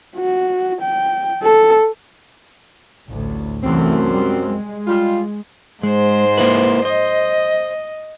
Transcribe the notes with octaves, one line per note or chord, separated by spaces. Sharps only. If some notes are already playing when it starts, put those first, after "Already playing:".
F#4
G5
A4
A1 D2 A2
C2 F#2 E3 A3 C4
G3 G#3
G#3
G3 F4
G#2 G#3 C5
A#3 E4 B4
C5 D#5